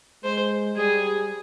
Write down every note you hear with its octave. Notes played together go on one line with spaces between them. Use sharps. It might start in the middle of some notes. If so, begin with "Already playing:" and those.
G#3 C5
G3 G#4